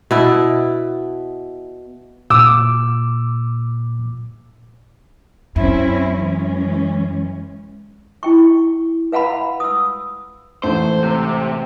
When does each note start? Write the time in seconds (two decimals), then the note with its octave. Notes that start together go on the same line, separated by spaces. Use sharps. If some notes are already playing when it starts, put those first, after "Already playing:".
0.11 B2 E4
2.30 A#2 D6 E6
5.56 F#2 C4 C#4 E4
6.15 E3 G#3 C#4
8.23 E4 G5 C#6
9.12 B4 F5 F#5 A#5 B5
9.60 D#6 E6
10.63 A1 G#2 A3 C5
11.03 C3